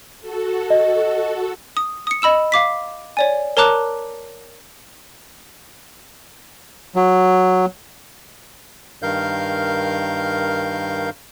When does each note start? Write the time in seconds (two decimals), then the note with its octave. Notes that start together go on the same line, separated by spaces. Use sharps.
0.20 F#4 A4
0.70 D#5
1.77 D#6
2.07 D#6 C#7
2.22 D#5 B5 E6 E7
2.52 F5 D6 B6
3.17 C#5 D5 G#5
3.57 A#4 C#5 A5 A#5 D6 F#6
6.96 F#3
9.03 G2 D#3 A#4 F5 G6